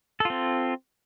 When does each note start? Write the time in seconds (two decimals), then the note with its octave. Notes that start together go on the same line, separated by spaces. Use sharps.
0.20 A4
0.25 F4
0.30 C4